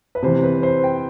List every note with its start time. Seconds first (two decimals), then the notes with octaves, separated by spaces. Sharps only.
0.15 B4
0.23 C3 E3 C5
0.43 B4
0.63 C5
0.84 G5